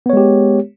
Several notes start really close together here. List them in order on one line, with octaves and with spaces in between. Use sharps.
B3 C#5 G#3 G4